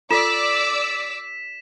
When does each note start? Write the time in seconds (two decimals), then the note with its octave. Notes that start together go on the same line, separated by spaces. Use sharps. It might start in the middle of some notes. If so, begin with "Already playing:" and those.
0.11 F4 A4 D5 D6 E6 B6 E7